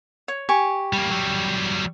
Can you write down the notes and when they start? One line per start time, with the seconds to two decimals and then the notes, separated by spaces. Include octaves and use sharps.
0.28 C#5
0.49 G4 G#5 C#6
0.93 G3 A#3
1.11 F#3 G3